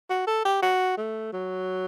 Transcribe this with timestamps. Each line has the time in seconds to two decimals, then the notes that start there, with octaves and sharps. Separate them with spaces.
0.10 F#4
0.27 A4
0.45 G4
0.62 F#4
0.98 A3
1.33 F#3